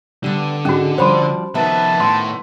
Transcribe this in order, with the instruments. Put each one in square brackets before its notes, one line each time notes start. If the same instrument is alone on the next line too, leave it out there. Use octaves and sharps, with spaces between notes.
[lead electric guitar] D3 [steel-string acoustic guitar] G3 B3
[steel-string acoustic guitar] G#2 G#3 D4 [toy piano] C#4 F#4
[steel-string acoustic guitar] F3 G3 D4 [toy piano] C5 B5 C6
[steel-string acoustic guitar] D#3 B3 [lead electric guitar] F3 E5 [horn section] B4 A5
[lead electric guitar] A2 [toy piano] C6